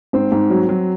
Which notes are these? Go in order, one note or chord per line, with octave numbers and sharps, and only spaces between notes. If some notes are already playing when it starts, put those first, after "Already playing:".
G#2 C4
G#2
F#3
F#3